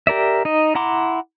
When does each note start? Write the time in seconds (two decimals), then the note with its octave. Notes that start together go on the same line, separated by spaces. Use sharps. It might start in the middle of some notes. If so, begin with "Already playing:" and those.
0.07 G4 A#4 D5 E5
0.45 D#4 D#5
0.75 E4 F#5 A#5 C6 D6